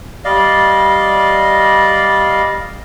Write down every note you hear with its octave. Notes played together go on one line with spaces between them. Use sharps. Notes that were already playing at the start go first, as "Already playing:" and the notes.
G3 D5 D#5 F5